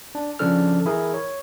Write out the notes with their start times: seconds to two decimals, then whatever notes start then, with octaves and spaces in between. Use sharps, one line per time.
0.15 D4
0.39 C#3 F3 C#4 D4 A4 F6
0.85 E3 E4 G#4 A#4
1.14 C#5